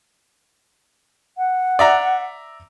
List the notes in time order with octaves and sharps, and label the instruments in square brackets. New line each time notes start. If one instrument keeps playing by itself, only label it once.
[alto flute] F#5
[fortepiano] D5 E5 A#5